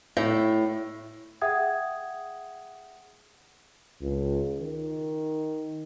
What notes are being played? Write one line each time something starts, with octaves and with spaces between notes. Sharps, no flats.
A2
G#4 E5 F#5 G5 D#6 G#6
C#2
D#3